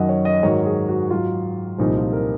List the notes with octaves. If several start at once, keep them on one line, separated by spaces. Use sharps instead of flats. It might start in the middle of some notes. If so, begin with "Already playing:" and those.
Already playing: F#2 D#3 F#3 D#5 F#5
C#5
D#5
G#2 D#3 F#3 C#5
G#4
F#4
G#2 F#3 F4
C2 A#2 F3 D#4
F4
A#4